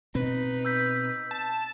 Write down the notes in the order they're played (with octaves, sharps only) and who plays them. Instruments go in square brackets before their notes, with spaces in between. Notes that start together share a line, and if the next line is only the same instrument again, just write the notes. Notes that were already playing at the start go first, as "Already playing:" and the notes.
[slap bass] B2 C4 [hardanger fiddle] D#4 B4
[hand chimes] E6 G6 B6
[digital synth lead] A5